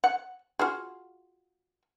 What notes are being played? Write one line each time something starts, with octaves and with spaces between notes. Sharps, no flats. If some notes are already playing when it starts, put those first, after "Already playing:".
F#5
F4 F#4 G#4